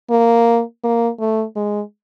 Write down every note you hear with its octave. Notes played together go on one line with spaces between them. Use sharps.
A#3
A#3
A3
G#3